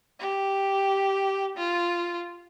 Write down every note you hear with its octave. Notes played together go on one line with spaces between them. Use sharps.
G4
F4